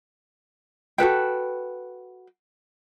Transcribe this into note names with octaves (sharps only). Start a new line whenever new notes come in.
F#4 A4 B4 G5